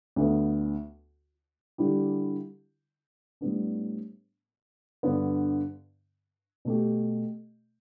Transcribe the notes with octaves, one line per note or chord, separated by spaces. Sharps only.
D2 D3 B3
D3 G3 E4 G4
A2 G3 B3 D4
G2 D3 B3
B2 A3 G4